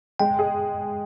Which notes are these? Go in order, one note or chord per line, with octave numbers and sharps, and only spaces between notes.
G#3 G5
G#4